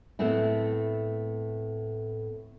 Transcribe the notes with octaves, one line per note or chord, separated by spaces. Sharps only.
A2 A3 B3 C4 E4